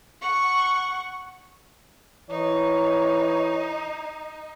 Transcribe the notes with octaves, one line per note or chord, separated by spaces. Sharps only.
F#5 C#6
E3 D#4 C#5